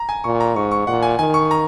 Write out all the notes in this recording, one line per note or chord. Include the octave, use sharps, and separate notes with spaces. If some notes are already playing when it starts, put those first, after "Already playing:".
Already playing: A#5
G#5
A#2 C#6
A#5
G#2 C#6
C#6
A#2 F#5
G#5
D#3 G#5
C#6
A#5